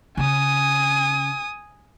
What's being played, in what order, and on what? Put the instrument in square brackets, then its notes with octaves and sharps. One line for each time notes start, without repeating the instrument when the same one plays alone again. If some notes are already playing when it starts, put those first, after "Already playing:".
[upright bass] C#3 [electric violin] G#5 D#6